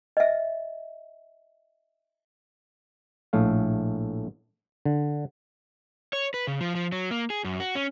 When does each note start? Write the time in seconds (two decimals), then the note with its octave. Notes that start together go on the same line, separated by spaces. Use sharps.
0.17 D#5 E5
3.33 A#1 A2 A3 F5
4.85 D3
6.13 C#5
6.34 B4
6.47 C#3
6.61 F3
6.75 F3
6.92 F#3
7.11 A#3
7.30 G#4
7.44 F#2
7.60 F#4
7.75 C#4